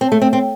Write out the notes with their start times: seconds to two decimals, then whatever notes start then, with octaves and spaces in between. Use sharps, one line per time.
0.01 C4
0.12 A3
0.21 C4
0.33 C4